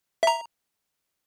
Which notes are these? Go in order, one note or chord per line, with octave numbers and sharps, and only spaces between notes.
E5 A#5